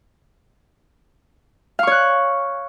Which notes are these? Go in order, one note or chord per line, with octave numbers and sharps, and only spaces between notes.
C#5 F5 C#6 F#6